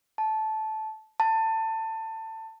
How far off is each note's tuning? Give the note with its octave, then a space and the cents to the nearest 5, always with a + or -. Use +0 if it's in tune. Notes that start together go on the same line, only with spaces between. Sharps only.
A5 -15
A5 +20